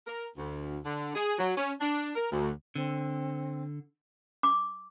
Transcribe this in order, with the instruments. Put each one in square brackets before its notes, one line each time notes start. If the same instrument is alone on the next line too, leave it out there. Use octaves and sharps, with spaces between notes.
[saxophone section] A#4
D2
D3
G#4
F#3
C#4
D4
A#4
D2
[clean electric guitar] D3 [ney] C4
[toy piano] D6